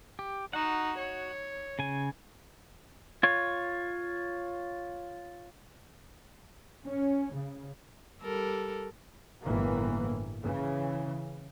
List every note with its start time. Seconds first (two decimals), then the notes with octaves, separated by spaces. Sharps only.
0.19 G4
0.53 D#4 F#4 F#5
0.98 C#5
1.79 C#3 G#5
3.23 F4 C#5
6.87 C#4
7.35 C#3
8.22 G3 A4 A#4
9.45 G1 A2 E3 A#3
10.43 C#3 E3